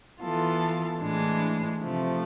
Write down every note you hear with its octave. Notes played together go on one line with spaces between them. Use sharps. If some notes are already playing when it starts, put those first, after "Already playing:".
E3 B3 F4 A4
A2 E3 G#3 D4
C3 F3 A3